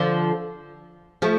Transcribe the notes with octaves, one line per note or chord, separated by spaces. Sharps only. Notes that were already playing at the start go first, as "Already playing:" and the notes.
Already playing: D3 F3
F3 A3